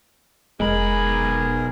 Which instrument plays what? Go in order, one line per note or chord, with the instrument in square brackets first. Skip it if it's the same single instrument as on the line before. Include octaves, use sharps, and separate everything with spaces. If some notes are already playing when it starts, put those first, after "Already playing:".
[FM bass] F1 [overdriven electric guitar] B1 B5 [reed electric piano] G#3 [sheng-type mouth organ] G#4 A#4